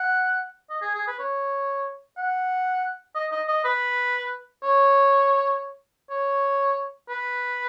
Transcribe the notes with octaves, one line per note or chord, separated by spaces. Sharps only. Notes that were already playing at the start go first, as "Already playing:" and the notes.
Already playing: F#5
D#5
G#4
G#4
B4
C#5
F#5
D#5
D#5
D#5
B4
C#5
C#5
B4